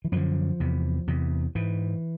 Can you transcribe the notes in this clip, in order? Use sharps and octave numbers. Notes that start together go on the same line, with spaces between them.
E3
F#2 D3 F3
E2 C3
E2 C3
G#2 E3